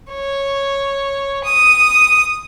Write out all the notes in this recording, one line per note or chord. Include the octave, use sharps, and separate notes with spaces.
C#5
D#6